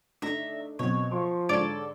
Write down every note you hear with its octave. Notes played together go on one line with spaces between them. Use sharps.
A3 D4 D#4 E5 A#5
B2 F#3 C4 C#5
F3 C6 C#6
G#2 D3 A4 C#5 D5